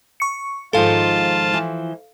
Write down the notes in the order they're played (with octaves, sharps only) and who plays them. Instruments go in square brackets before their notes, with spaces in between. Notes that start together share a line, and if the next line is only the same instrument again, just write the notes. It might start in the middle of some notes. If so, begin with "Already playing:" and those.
[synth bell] C#6 C#7
[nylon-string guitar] G#2 D#3 F3 [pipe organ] F4 A5 [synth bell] A4 F5
[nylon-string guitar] E3 F3